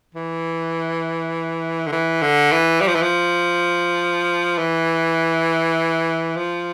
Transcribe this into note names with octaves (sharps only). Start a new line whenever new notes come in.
E3
D3
E3
D3
E3
G3
F3
E3
F3
E3
F3